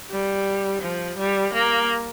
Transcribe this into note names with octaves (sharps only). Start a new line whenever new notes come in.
G3
F3
G3
A#3